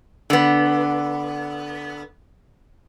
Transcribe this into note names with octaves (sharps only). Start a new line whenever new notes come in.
D3 B3